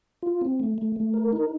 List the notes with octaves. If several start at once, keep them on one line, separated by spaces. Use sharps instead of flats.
F4
C4
A3
A3
A3
A#4
D#4